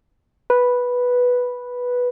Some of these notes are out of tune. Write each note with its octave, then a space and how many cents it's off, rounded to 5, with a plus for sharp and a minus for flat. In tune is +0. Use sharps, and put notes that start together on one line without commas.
B4 -5